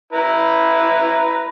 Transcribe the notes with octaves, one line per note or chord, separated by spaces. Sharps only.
E4 B4 A#5